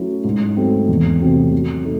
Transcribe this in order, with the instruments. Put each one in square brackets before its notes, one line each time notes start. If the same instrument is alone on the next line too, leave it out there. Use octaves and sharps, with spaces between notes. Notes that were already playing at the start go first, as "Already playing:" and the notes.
Already playing: [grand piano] F#3 A3 C#4 E4
G#2
F#3 A3 C4
E2
C3 F#3 A3 C4
F#3
A3 D#4